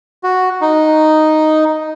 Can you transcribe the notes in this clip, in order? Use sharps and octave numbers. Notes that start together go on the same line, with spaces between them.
F#4
D#4